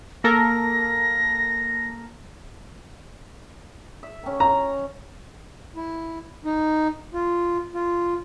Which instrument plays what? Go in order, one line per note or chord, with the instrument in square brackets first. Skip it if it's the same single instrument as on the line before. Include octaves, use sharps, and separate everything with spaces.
[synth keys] A#3 A4 A#4 [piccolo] A#6
[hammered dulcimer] E5
D#3 C#4
[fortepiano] A#5
[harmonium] E4
D#4
F4
F4